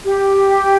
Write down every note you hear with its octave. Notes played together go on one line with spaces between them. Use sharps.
G4